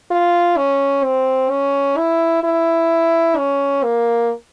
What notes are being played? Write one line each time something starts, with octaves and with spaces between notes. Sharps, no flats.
F4
C#4
C4
C#4
E4
E4
C#4
A#3